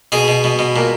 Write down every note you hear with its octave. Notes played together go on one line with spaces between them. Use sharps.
B2 G#4
B2
B2
B2
A#2